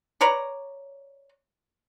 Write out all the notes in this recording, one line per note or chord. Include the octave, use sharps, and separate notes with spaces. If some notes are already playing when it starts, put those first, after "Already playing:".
B4 C#5 D5 A#5